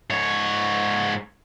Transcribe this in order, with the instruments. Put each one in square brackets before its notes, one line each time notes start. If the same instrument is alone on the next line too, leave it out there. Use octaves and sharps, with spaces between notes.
[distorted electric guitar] G#2 C#5